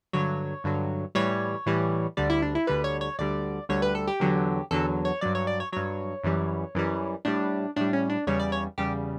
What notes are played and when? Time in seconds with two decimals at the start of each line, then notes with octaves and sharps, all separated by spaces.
0.13 G2 D3 F#3 C#5
0.64 G2 D3 F#3
1.15 A2 E3 G3 C#5
1.66 A2 E3 G3
2.17 D2 D3 G3 D5
2.30 E4
2.42 D4
2.55 E4
2.67 D2 D3 G3 B4
2.84 C#5
3.01 C#5
3.19 D2 D3 G3 D5
3.69 D2 D3 G3 C#5
3.82 B4
3.95 A4
4.08 G4
4.20 E2 D3 F#3
4.71 E2 D3 F#3 A4
5.05 C#5
5.21 G2 F#3 D5
5.35 C#5
5.47 D5
5.60 C#5
5.73 G2 F#3 C#5
6.24 F#2 E3 G3
6.75 F#2 E3 G3
7.25 A2 G3 D4
7.76 A2 G3 D4
7.93 C#4
8.10 D4
8.27 E2 C#3 G3 C#5
8.40 D5
8.52 C#5
8.78 E2 C#3 G3 G4